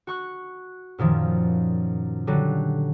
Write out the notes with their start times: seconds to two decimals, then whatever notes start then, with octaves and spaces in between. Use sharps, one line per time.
0.07 F#4 C#6 F#6
0.98 F#2 A#2 D#3 F3
2.27 D3 F#3 G3